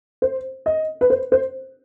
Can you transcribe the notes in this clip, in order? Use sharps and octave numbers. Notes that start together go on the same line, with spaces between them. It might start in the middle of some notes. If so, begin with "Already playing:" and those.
C5
D#5
B4
C5
C5